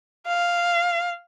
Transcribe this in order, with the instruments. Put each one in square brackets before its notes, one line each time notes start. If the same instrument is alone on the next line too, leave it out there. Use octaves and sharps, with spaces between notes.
[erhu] F5